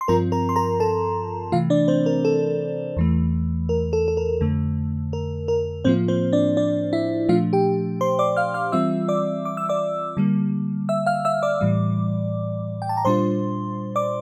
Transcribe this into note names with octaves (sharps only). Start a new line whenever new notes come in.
C6
G2 F3 C4 F4 A#4 A#5
A#4 A#5
C6
A#4 A#5
A4 A5
C3 E3 A3 F4 F5
D4 D5
C4 C5
A#4
A4
E2 E3 A3
A#4
A4
A4
A#4
F2 D3 A3
A#4
A#4
A2 F3 A#3 C4 F4 C5
C4 C5
D4 D5
D4 D5
E4 E5
A#2 F3 A3 D4 F4 F5
G4 G5
C5 C6
D5 D6
F5 F6
F5 F6
E3 G3 C4 F4 E5 E6
D5 D6
D6
E6
D5 D6
D3 G3 A#3
E5 E6
F5 F6
E5 E6
D5 D6
A2 E3 G3
G5
A5
A#5
A#2 G3 D4 F4 C5 C6
D5 D6